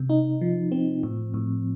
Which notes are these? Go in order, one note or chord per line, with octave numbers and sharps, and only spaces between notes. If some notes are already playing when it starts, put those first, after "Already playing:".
Already playing: C3
D#4
F3
C4
A2
A2